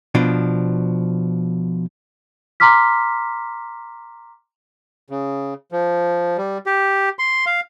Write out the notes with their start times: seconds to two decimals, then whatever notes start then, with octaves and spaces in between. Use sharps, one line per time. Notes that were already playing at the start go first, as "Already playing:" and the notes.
0.15 B2 F3 D4
2.60 A#5 C6 D6 F6 B6
5.10 C#3
5.72 F3
6.37 G3
6.66 G4
7.19 C6
7.46 F5